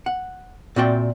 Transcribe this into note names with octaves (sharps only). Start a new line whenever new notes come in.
F#5
A#2 C4 F#4 D5 E5 G5